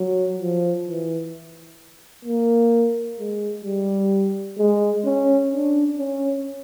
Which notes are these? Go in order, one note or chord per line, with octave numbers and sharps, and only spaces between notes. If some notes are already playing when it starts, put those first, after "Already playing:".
Already playing: F#3
F3
E3
A#3
G#3
G3
G#3
C#4
D4
C#4